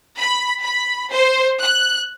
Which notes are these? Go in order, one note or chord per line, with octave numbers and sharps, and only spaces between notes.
B5
B5
C5
F#6